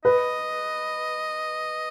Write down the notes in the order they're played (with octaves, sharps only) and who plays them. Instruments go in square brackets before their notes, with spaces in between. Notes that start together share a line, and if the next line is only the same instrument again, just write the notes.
[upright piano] B4 [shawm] D#5